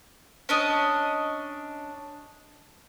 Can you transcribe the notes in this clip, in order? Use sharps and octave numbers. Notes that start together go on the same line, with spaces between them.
C#4 D4 D#5